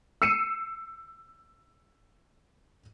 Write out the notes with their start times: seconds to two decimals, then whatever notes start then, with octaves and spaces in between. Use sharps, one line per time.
0.22 E6 C7 C#7 D#7 E7